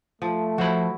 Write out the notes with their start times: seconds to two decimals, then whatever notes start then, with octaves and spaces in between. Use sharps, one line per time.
0.22 F3 A3
0.58 F3 E4 F#4 C5 B5